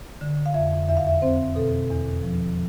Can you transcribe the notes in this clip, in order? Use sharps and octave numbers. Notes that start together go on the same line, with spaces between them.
D3
F5
F2 E5
E2 E5
F5
E5
C4 C5
B2 A4
E2
F3